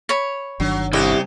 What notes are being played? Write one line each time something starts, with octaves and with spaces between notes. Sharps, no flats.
C#5 B5
G1 D#3 F#3 D4
C2 C#3 C#4 G4 D#5